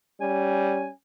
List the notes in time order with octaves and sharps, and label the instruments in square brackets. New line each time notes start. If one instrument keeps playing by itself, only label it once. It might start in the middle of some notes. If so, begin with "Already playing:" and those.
[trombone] G3 [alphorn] C#4 [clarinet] G#5